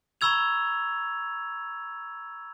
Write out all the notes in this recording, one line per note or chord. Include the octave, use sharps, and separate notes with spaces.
A#5 B5 C#6 E6 G#6 F7